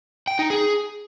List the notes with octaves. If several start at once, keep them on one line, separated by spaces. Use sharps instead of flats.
G5
D#4
G#4